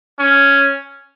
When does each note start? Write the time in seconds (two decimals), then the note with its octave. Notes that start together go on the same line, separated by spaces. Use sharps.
0.19 C#4